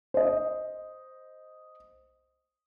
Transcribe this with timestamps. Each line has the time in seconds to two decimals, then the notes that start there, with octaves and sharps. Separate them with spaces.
0.14 C5 D#5